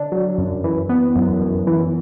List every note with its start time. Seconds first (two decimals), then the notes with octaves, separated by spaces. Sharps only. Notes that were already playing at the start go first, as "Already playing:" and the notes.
Already playing: D3 D4
0.12 F#3
0.38 F#2
0.64 E3
0.89 B3
1.16 F#2
1.41 F#2
1.67 E3